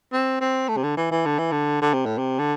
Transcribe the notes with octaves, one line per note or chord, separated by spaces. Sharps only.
C4
C4
A3
C3
D3
E3
E3
D3
E3
D3
D3
C3
A2
C3
D3